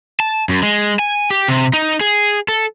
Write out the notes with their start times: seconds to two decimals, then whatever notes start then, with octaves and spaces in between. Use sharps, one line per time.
0.20 A5
0.49 F#2
0.63 G#3
0.99 G#5
1.30 G4
1.48 C3
1.73 D#4
2.01 G#4
2.48 A4